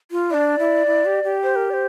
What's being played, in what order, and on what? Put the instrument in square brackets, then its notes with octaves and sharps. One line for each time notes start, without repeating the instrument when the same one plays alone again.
[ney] F4
[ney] D4 E4 [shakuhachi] D5
[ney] E4
E4
G4
G4
[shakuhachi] C5
A#4
D5
C5